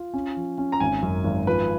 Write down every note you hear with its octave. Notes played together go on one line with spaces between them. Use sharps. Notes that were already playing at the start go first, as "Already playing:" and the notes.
Already playing: F4
C#4
F3
C#4
A#5
G#1 G#5
F#2
G#1
F3 B4